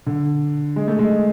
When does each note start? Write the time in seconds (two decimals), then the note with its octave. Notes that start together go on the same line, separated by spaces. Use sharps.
0.06 D3
0.76 G#3
0.88 A3
0.99 G#3